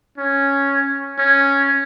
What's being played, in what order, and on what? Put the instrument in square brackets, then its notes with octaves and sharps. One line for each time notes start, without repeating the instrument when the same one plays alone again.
[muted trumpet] C#4
C#4